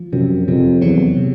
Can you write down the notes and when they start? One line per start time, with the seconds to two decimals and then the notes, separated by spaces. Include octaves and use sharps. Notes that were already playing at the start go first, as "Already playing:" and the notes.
Already playing: F3
0.13 F#2 C3
0.48 F2 C3
0.81 E2 F#3
1.17 C3